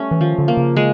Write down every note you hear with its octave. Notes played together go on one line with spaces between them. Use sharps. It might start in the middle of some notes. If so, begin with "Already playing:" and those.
Already playing: G3 A3 C#4
E3
D#3 F3
D3
A#3
C#3
G#3